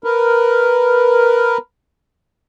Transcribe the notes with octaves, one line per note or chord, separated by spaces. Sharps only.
A#4 B4